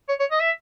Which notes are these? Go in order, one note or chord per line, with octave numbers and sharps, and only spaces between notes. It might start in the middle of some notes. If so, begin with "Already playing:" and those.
C#5
C#5
D#5
E5